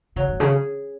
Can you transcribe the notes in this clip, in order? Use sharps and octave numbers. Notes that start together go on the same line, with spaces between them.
C#3 F#3
G#2
C#3 C#4 G#4